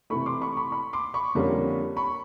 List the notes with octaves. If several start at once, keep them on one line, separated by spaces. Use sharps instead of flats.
C3 E3 A3 B5 C#6
C6 D6
B5 C#6
B5 C#6
B5 C#6
C6 D6
B5 C#6
F2 D3 G3 A#3 C#4
B5 C#6